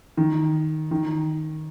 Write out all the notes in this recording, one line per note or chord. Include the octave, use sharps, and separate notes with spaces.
D#3
D#3